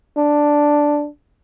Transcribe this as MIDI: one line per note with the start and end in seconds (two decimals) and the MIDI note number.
0.17 1.07 62